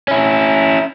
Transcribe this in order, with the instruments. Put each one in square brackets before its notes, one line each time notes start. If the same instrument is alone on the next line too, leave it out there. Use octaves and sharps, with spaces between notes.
[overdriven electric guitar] C#4 E4